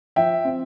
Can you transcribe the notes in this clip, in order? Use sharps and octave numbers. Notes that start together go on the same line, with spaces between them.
F3 E5 G5
C4